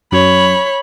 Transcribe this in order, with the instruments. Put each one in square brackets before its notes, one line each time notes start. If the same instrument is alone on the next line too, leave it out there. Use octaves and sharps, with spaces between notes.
[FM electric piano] F#2 [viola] C#5 B5